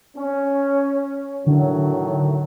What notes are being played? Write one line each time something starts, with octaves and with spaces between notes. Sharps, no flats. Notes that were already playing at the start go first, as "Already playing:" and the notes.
C#4
A2 D3 D#3 F#3